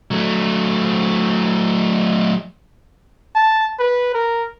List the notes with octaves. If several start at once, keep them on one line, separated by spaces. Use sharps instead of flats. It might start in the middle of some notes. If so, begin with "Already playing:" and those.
F#3 A3
A5
B4
A#4